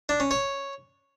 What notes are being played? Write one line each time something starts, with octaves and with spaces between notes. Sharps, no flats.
D4
C#4
C#5